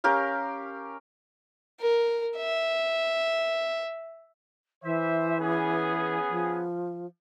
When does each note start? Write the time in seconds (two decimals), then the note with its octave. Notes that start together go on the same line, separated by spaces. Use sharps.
0.04 C#4 G4 A#4 F5
1.81 A#4
2.37 E5
4.83 E3 C5 E5
5.38 B3 C#4 G#4
6.29 F3